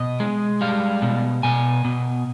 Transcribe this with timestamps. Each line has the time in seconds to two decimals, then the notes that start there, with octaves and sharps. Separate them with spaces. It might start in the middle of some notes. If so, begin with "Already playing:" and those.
Already playing: B2 D#5
0.20 G#3
0.61 G3 F5
1.02 B2
1.43 B2 G#5
1.85 B2